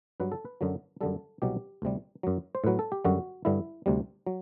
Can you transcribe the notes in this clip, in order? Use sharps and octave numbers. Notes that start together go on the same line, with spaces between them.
G2 F#3 B4
A4
B4
F#2 D3 F#3
F#2 D3 G3 A4
C2 B2 F#3 G4
D2 C3 G3
F#2 F#3
C5
A2 F#3 B4
A4
G4
F#2 D3 G3 F#4
G2 D3 G3 E4
D2 C3 G3
F#3